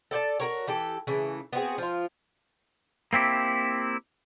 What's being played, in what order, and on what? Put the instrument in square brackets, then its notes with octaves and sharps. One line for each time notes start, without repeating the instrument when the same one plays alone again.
[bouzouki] A4 D5 G5 A5
F#4 A#4 C#5
E3 G4 A4
C#3 E3 A3
B3 C4 F#4 G#4
F3 F4
[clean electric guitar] A#3 C4 E4 G4